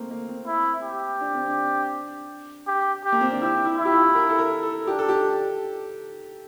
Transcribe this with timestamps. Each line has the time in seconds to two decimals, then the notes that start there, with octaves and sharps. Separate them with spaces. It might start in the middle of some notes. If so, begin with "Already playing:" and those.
Already playing: A3 A#3 C4
0.11 A#3
0.28 C4
0.47 E4
0.83 G4
1.21 D4
1.34 C4
1.48 D4
2.67 G4
3.04 G4
3.12 A#3
3.21 C4
3.31 D4
3.41 E4 G4
3.65 E4
3.78 E4
3.85 G4
3.90 F4
4.15 A#4
4.29 A4
4.39 A#4
4.63 A4
4.87 D4 G4
4.99 A4
5.09 G4